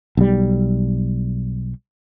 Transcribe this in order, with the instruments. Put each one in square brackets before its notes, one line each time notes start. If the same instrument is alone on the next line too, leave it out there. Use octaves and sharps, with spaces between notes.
[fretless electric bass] B1 G3